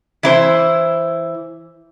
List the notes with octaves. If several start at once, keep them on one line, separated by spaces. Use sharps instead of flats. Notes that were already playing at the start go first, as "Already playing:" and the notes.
E3 E4 C5